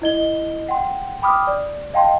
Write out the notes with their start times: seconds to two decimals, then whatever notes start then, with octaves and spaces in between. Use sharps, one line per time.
0.02 E4 D#5 G7
0.69 F#5 G5 C6
1.22 G5 B5 D6 D#6 F6
1.47 D5
1.94 D#5 F5 G5 A5 C6